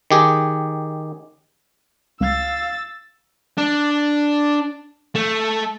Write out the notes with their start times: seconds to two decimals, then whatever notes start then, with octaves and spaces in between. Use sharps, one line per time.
0.11 D#3 G4 G#4
2.20 C#2 F5 E6 A6
3.57 D4
5.16 A3